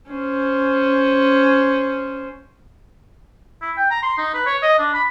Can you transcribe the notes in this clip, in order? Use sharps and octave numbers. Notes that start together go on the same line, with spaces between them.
C#4 C5
E4
G5
A#5
C6
D#4
B4
C#5
D#5
D4
B5